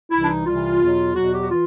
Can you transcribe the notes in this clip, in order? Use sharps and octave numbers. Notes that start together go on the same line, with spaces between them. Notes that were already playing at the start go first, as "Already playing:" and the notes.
C2 C3 E3 E4
D4
D#4
C2 C3 E3 F4
E2 B2 F#3
E2 B2 F#3 F#4
G4
F#4
E3 F4